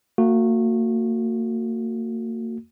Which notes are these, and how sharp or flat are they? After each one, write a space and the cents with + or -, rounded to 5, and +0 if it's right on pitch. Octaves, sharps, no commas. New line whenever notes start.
A#3 -40 F#4 -15